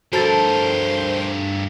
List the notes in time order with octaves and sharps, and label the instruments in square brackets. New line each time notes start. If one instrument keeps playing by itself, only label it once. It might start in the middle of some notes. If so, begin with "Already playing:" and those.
[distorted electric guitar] G2 A#4 [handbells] F#4 A5 A6 [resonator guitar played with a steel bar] A4 [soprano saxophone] C5